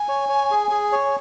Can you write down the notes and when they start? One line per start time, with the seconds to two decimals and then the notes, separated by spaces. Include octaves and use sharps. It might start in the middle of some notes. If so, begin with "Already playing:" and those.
Already playing: G#5
0.09 C#5
0.29 C#5
0.51 G#4
0.71 G#4
0.92 C#5